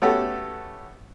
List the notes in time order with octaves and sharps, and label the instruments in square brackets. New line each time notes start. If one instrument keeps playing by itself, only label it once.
[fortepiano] A3 B3 C#4 F#4 G4 A4